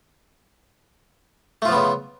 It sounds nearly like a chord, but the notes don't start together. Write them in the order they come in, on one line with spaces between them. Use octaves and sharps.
A3 F4 F3 B3 C#3